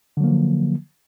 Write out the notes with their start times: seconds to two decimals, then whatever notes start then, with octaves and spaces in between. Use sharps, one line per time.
0.17 D3
0.20 F#3
0.24 A#3
0.27 F3